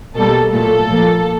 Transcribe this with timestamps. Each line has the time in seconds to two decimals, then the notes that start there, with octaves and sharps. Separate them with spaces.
0.16 B2 G3 A#3 A4
0.52 A#2 F#3 A3 A4
0.88 A#2 F3 A#3